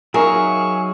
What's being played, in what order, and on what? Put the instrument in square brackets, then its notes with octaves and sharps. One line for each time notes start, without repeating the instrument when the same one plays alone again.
[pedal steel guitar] F#3 E5 F5 [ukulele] D#4 A#4 [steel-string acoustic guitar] G#4 [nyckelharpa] C#6